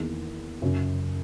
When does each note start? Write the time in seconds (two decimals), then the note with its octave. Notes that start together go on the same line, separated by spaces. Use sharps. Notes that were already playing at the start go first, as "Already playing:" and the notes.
Already playing: E2 D#3 A#3 E4 G#4
0.62 F#2 C#3 F#3